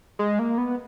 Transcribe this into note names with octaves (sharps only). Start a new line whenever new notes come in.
G#3
A#3
B3